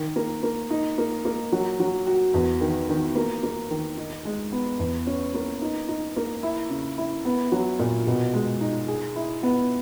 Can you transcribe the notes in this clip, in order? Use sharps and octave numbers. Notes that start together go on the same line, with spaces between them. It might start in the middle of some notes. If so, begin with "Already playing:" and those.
Already playing: D#3
A#3
A#3
D#4
A#3
A#3
F#3
F#3
F#4
E2
D#3
D#3
A#3
A#3
D#3
D#4
G#3
B3
E2
C#4
A#3
D#4
D#4
A#3
E4
C#3
E4
B3
F#3
A#2
B2
G#3
D#4
G#4
E4
B3